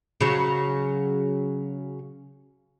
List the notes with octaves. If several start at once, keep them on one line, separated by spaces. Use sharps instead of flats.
C#3 F#3